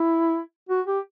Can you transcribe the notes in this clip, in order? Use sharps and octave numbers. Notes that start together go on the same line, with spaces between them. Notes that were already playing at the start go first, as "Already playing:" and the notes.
Already playing: E4
F#4
G4